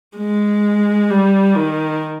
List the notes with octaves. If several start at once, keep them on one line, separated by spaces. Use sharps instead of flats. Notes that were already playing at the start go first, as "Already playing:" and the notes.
G#3
G3
D#3